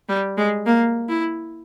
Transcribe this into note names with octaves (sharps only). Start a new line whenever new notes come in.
G3
G#3
A#3
E4